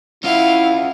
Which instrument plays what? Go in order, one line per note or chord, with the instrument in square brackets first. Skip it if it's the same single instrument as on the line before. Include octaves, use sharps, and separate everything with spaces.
[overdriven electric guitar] C#4 F4 [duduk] E4 [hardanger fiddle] F5 [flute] F#5